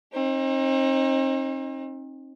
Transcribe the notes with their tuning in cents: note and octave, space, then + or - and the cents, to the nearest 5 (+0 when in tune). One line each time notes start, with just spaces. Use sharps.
C4 +40 D#4 +0